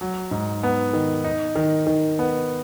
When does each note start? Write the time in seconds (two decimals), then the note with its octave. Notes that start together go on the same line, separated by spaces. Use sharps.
0.01 F#3
0.31 G#2
0.63 B3
0.93 D#3
1.24 D#4
1.56 D#3
1.87 D#3
2.19 B3